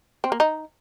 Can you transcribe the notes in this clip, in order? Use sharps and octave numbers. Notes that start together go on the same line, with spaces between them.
C4
A#3
D#4